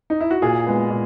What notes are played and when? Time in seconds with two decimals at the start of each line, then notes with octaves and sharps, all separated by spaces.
0.10 D#4
0.21 E4
0.31 F#4
0.42 A#2 G#4
0.67 G#3 B3
0.90 A#2